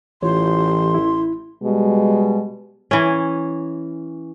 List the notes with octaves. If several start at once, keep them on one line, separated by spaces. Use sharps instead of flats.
A1 E3 F4 G4 C#5 C6
E4
B2 G3 G#3
E3 C#4